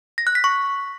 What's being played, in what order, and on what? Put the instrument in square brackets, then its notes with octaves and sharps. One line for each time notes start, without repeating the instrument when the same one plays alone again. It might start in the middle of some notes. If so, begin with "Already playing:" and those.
[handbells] A#6
F#6
B6
C#6